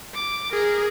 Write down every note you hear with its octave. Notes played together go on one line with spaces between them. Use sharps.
D6
G#4 A#4